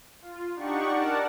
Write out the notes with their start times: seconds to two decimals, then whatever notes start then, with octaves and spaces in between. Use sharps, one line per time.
0.22 F4
0.55 D4 D#4 G4 D5 F#5 C#6
0.89 A#4 D5 F#5 A5